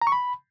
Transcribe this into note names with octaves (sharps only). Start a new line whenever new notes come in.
A#5
C#6
B5